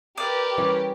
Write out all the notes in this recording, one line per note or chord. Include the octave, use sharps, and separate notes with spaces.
G4 A#4 B4 D5
E3 G3 C#4